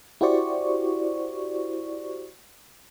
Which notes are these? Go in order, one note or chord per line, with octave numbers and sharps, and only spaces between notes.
E4 F#4 G4 C5 D5 C#6